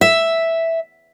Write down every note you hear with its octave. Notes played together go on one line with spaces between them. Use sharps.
E5